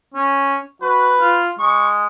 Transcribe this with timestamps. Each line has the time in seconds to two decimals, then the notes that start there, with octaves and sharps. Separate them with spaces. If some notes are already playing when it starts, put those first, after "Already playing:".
0.14 C#4
0.82 F#4 B4
1.20 F4
1.59 G#3 C#6